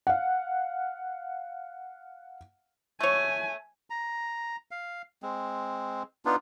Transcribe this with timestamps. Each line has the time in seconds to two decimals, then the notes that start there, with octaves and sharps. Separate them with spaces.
0.07 F5 F#5
3.01 A3 C#5 G#5
3.90 A#5
4.71 F5
5.23 G#3 C4
6.25 B3 D4 D#4 F4